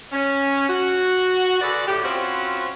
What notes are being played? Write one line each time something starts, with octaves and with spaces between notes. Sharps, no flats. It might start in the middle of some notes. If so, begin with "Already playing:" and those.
C#4
F#4
D3 F#4 G#4 B4 D5
A2 G4
C4 C#4 F4 F#4 B4 C5